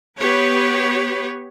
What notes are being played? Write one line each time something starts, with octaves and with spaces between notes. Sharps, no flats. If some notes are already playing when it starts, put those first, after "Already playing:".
B3 G4 B4 C#5